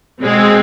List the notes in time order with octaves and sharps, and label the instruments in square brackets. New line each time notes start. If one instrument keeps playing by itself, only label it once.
[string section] B2 G#3 C4